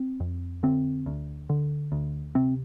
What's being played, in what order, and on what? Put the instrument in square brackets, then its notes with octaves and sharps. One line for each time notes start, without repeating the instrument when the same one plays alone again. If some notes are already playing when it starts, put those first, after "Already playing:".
Already playing: [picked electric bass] C4
F2
D3 C4
D2
D3
D2
C3 C4